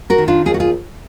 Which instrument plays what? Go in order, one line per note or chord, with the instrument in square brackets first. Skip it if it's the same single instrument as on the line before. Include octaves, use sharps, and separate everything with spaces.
[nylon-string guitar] F#4 A#4
D#3
D4 F4
D#2 F4 G#4
F#4
F4 G#4